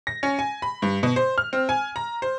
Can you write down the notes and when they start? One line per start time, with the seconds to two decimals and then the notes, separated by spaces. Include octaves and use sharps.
0.07 A#6
0.23 C#4
0.39 G#5
0.62 B5
0.82 G2
1.03 B2
1.16 C5
1.38 F6
1.53 C4
1.69 G#5
1.96 A#5
2.22 C5